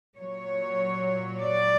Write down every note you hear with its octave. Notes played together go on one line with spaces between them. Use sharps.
A#2 F#3 C#5
D5